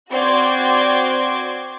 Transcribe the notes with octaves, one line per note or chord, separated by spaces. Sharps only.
C4 F#4 D5 C6 D6 G#6